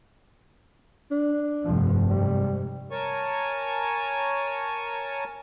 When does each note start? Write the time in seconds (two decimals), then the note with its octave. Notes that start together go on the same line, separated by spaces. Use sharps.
1.11 D4
1.64 F1 G2 F3
2.09 G#2 C3 G3
2.91 A#4 C#5 G#5 A5 C#6